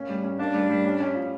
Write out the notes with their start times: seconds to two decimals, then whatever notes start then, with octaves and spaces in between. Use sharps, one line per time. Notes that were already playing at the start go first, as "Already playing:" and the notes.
Already playing: A#3 C#4
0.09 G3
0.24 C#4
0.39 A#3 D4
0.54 G3
0.69 G3
0.84 C#4
1.00 C#4
1.14 F3